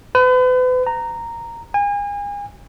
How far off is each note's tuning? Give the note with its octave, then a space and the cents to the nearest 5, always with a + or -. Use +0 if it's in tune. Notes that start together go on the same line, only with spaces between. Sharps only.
B4 +40
A#5 -10
G#5 -35